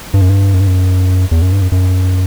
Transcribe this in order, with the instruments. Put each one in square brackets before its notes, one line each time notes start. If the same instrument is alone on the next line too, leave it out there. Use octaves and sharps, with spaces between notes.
[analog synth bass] G2
F#2
G2
F#2
G2
F#2
E2
F#2
G2
F#2
F#2